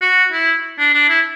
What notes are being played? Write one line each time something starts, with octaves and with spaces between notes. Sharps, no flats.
F#4
E4
D4
D4
E4